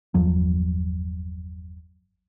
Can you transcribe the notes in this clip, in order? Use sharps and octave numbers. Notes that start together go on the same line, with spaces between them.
G1 E2 F3 F#3